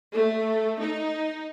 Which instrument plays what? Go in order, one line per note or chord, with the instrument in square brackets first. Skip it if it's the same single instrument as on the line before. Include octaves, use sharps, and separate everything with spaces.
[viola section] A3
D#4